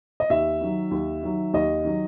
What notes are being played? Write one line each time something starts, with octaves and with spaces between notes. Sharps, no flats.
D#5
D#2 E5
D#3 F#3
D#2
D#3 F#3
D#2 D#5
D#3 F#3